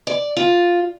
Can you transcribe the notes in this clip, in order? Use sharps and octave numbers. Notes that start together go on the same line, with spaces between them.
D5
F4